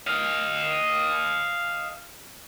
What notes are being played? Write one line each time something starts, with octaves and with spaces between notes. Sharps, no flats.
D#5 F5